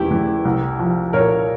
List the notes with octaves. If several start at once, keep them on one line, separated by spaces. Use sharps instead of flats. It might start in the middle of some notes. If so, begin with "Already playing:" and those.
Already playing: E1 E2 E4 G4
E3
C2
F3
A#2 A#4 C#5